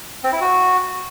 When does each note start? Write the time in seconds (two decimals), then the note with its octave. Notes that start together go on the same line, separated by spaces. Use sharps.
0.24 C4
0.32 E4
0.41 F#4